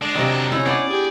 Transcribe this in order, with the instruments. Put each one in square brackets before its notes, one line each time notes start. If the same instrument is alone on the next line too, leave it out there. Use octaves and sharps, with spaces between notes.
[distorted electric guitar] G#3 [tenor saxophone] D4
[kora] C3 D#4 [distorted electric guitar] D#3 F#3
[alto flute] C#4 [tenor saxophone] D#4 [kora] E4
[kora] B3 D4 [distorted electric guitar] D5
[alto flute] G4 [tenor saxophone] G#4